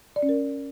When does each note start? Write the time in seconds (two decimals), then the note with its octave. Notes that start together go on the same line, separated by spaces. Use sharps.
0.16 D5
0.22 C#4
0.29 A#4